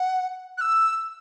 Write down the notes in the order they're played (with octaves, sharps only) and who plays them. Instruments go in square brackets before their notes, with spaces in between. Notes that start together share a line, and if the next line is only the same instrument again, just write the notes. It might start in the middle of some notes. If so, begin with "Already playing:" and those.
Already playing: [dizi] F#5
F#6
E6